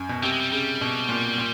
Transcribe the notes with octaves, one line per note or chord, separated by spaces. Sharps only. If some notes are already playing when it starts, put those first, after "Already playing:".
Already playing: F#2
B2
C3 G3
G#3
G3
C#3 G3
B2
A#2
A#2